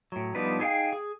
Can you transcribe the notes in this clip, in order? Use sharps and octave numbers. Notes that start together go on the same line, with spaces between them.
A2 F#3
F3 G3 B3 D4 D#4 B4
D#4 E4 G#4 A4 F5 G5
G#4